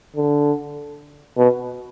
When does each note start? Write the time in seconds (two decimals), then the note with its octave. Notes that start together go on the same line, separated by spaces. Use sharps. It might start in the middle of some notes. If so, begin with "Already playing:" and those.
0.16 D3
1.38 B2